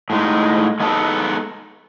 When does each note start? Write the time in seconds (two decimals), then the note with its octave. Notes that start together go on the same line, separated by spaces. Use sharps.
0.10 A2 G#3 D#4
0.80 G#3 B3 D#4 A4